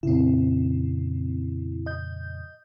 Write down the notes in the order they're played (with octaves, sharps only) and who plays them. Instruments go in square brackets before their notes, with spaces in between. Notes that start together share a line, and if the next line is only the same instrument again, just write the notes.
[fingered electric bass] F2 A#2 C#3 [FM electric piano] C4 E4
[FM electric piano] D#5 G6